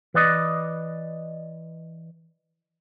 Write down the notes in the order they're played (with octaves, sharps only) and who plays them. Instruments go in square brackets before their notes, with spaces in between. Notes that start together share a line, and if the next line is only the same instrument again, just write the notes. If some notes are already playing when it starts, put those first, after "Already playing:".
[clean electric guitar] E3 B4 D5 D#5